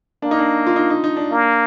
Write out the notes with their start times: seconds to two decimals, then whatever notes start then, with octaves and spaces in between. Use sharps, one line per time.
0.22 A#3 D4
0.31 D#4
0.39 D4
0.67 F4
0.76 D#4
0.90 D#4
1.04 D#4
1.17 D4
1.31 A#3